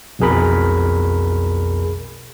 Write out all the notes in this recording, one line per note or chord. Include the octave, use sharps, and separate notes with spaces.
B1 F2 B2 G#4 A#4 B5